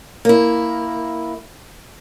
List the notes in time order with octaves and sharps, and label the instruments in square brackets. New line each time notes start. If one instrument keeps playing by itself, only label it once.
[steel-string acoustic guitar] A#3 E4